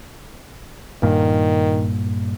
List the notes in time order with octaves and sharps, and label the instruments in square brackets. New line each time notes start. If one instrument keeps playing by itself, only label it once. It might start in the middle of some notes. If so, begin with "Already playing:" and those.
[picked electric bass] G2 A#2 [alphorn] D#3